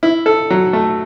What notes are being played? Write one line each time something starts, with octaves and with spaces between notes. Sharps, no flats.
E4
A4
F#3
A3